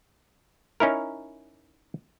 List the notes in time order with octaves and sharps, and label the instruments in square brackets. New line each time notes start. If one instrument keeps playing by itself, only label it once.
[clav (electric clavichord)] C#4 D#4 E4 A#4